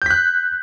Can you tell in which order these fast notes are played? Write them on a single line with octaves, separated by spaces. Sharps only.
G6 B6 F#6